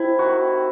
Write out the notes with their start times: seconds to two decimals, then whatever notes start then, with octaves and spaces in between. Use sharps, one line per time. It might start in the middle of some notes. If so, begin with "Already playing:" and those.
Already playing: C3 E4
0.19 D#3 F#4